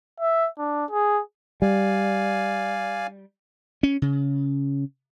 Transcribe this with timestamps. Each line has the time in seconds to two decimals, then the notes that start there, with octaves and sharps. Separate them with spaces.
0.20 E5
0.59 D4
0.90 G#4
1.62 G3 D5 F5 G#5
3.83 C#4
4.02 C#3